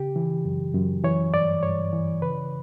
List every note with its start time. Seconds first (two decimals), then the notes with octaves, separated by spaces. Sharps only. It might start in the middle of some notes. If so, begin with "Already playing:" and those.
Already playing: C#3 G4
0.16 E3
0.45 F#2
0.74 F#2
1.04 E3 C#5
1.34 G2 D5
1.63 G2 C#5
1.93 E3
2.21 C#3 B4